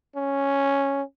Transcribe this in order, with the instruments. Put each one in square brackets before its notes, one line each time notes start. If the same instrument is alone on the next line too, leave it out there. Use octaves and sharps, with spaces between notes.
[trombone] C#4